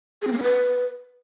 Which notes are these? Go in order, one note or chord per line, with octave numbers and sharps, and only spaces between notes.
G#4
C4
A#3
C#4
B4